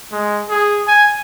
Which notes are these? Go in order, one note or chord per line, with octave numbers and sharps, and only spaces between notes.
G#3
G#4
G#5